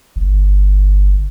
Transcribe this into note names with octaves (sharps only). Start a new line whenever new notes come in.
G1